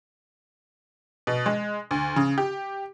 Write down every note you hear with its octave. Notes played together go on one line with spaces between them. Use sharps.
B2
G#3
D2
C#3
G4